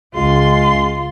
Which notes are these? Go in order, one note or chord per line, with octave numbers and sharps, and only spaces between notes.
C#2 G#3 F4 C6